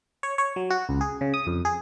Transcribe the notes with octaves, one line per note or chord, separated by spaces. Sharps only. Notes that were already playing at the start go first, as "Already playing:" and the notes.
C#5
C#5
F#3
F#4
C#2
G#4
C#3
D#6
F2
G#4